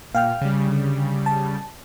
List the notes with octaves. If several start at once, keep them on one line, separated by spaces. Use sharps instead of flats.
A#2 F5 G5 F6
C#3 G3
D3
A5